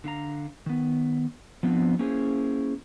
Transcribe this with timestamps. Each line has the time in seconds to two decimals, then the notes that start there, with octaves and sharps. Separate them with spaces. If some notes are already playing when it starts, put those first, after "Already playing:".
0.04 D3 D4 F5 A#5
0.66 D#3 B3
1.63 F3 B3 C4 D4
1.99 A#3 C#4 E4 G#4 C5